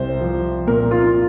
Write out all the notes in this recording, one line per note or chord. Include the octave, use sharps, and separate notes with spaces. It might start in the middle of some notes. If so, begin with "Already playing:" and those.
Already playing: C2 C5
F3
A#2 A#4
F4